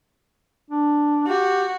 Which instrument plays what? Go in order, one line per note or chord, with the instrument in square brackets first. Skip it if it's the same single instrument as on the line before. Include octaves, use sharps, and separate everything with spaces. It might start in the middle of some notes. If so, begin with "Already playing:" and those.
[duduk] D4
[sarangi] F#4 [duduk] G4